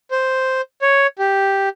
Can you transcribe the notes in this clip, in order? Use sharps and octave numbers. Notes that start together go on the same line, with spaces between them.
C5
C#5
G4